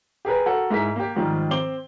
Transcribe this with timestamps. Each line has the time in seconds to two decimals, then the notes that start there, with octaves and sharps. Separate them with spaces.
0.25 G4 G#4 A#4 B4
0.46 F#4 A4 A#4 F#5
0.70 G#2 E4 G#4 A#4 B6
0.96 A#3 G4
1.16 G#2 D#3 F3 G3
1.51 C4 C6 D6 G7